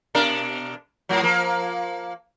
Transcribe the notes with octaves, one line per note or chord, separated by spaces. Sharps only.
B2 D4 A#4
A2 F#3
F3 A#3